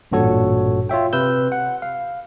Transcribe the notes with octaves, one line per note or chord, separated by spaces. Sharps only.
A1 G2 A#2 F#4 A4 C#5
F4 C#5 E5 G5
C3 B4 E6 G6
F#5
F5